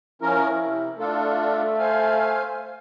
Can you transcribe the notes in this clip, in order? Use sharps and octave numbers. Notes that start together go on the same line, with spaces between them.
F3 C#4 E4 A#4
C3
A3 D4 F4 A4
C5 F5 G#5